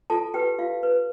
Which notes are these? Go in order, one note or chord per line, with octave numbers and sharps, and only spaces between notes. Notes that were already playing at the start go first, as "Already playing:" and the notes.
F4 A4 A5
G4 B4 G5
F4 F5
B4